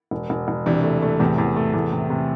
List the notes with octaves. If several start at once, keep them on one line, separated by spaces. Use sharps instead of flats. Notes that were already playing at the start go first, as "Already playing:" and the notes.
E1
E1
E1
C3 E3 D4
A3
A3
E2 A2 C3
E2
A3
E2 A2
C3
C3